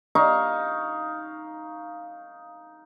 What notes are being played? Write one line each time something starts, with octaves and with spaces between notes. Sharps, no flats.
D#4 F5 C#6